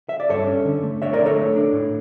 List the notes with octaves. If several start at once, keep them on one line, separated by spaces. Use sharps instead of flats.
E5
D5
G2 A4 C#5
C#4
D3
A3
D3 C#5 E5
A#4 D5
D3
A4 C#5
A3
D4
A2